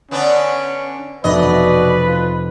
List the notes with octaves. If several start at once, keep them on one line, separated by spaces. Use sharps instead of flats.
D3 B3 C#4 D4
F1 B2 B4 D5 D#5
F4